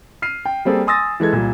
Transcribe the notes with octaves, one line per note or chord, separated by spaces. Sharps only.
F6 C7 D#7
G5
G3 A#3 C4 G#4 A4
G#5 C6 D#6 E6 A6 A#6
E3 G#3 A4 G#6
C2 A#2